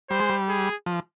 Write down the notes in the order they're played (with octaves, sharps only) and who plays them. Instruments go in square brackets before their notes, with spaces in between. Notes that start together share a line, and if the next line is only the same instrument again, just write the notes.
[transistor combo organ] G3 [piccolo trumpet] C5
[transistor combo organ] G#3
G3
[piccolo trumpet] G#4
[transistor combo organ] F3